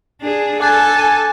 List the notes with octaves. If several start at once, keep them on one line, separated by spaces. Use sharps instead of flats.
D4 G#4
A4 G#5 A5 D6 F#6 A6
A6 D#7